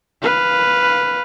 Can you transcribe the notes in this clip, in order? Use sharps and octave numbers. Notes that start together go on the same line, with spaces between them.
B4 F5